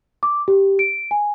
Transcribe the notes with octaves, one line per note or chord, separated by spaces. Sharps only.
D6
G4
D7
G#5